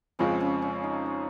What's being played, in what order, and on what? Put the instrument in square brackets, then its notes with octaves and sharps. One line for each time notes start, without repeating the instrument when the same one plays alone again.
[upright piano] F2 C#3 F3 G#3 C4 [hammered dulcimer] C#4
[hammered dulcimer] C#4
C#4
D#4
D#4